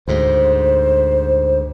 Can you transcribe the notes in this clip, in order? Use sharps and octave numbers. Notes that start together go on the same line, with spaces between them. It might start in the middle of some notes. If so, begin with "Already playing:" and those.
D2 G#2 C5